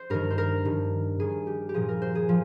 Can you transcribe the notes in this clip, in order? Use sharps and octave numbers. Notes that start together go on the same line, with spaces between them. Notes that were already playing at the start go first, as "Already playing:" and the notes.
Already playing: C5
G2 D#3 A#4
C5
A#4
G2 D#3
G2 D#3 G#4
G4
G4
A#2 F3 G#4
A#4
C5
G#4
F3